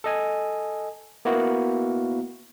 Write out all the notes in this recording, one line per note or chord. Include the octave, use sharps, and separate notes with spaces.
A4 D#5 G#5
A#3 B3 E4 F#4 A#4